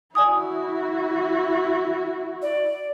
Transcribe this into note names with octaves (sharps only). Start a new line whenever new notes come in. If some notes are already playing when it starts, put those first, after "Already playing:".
E4 F#4 D5 G#5 D#6
D5